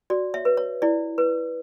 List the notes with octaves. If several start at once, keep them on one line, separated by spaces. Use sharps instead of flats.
F#4 D5
C#5 E5
B4
C#5
E4 D5
B4